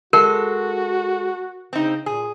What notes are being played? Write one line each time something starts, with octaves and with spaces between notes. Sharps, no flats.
G#3 F#4 A4 A#4
C#3 C4 D#4
A#2 G#4